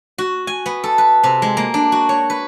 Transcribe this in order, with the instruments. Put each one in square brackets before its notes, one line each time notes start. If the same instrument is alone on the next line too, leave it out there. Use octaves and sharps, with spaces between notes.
[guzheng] F#4
G#5
B3
A4
B4
C3
G#3
A#3
D4
F#4
C#5
B4